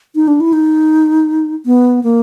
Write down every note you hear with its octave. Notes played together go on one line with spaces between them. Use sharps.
D#4
D4
E4
D#4
B3
A#3